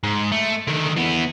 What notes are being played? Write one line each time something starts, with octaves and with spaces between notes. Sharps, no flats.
G#2
A3
D3 D#3
E3 B3